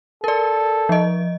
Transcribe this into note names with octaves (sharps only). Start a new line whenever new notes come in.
A4 A#4 D5
F3 D#5